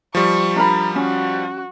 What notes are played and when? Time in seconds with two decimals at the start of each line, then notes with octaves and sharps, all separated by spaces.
0.15 F3 G3 C#6
0.56 D4 A#4 A#5 B5
0.96 C#4 F#4